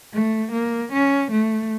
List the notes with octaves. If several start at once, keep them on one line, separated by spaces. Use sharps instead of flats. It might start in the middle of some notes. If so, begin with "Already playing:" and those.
A3
A#3
C#4
A3